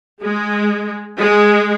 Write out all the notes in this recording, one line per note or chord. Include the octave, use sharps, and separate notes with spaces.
G#3
G#3